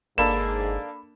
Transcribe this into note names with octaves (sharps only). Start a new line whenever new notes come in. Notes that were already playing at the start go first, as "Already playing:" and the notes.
G1 G#2 A#3 D4 G#4 A4 B5 E7